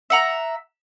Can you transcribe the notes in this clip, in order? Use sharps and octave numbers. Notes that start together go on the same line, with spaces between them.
E5 F#5 A#5